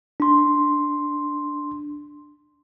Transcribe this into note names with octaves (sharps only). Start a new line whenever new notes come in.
D4 C6